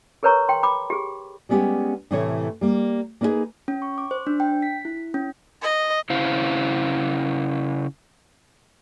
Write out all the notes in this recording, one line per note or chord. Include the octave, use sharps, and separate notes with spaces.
G#4 A#4 B4 C#5 A#5 C#6
G5 C6
B5 D6
G4 G#4
G3 G#3 B3 C#4 G4
A2 C3 E3 A3 C#5
G3 A#3
A#3 B3 D#4 E4 G#4 B4
C#4
C#6
D6
C5
D4
G5
B6
E4
C#4
D#5
C#3 E4 C5 F5